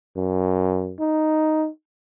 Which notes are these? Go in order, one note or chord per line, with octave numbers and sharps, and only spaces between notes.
F#2
D#4